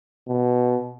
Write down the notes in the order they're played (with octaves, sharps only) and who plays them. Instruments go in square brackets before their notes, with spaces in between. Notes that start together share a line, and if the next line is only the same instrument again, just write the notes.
[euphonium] B2